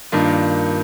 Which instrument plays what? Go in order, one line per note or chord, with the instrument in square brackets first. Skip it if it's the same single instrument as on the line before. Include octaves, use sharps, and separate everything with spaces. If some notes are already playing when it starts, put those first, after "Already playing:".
[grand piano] G2 D#3 A#3 D4 F4